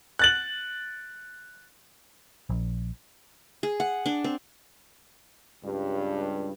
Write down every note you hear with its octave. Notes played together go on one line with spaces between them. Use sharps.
F#6 A6 F#7
A#1
G#4
F#5
D4
C4
C#2 G2